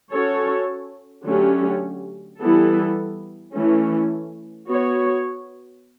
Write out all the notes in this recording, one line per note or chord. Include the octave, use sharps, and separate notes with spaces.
C#4 F#4 A4 C#5
D3 F#3 A3 C#4 G4
E3 G3 B3 E4 A4
E3 A3 C#4
B3 F#4 C#5